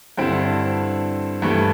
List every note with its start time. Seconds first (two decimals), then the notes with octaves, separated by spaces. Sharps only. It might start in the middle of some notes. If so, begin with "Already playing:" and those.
0.18 G2 D3 C4 E4
1.42 G2 E3 A3